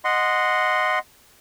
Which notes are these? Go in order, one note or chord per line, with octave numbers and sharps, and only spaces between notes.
D#5 F#5 C6